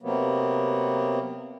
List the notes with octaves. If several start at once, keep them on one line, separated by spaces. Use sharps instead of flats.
C3 F#3 A#3 B3